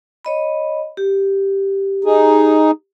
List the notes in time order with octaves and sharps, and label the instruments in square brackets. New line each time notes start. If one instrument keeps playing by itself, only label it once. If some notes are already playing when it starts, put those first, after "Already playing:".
[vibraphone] C#5 D#5 B5
G4
[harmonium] D#4 G#4